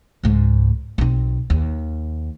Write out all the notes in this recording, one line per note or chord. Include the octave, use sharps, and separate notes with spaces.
C#2 G#2
B1 C4
D#2